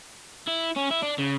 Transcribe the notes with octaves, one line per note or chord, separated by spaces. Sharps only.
E4
C#4
E4
D4
C#3